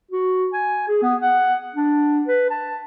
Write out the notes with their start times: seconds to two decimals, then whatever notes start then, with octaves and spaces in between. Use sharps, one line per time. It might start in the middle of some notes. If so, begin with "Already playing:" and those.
0.11 F#4
0.53 G#5
0.88 G#4
1.02 B3
1.21 F#5
1.75 D4
2.27 B4
2.50 A5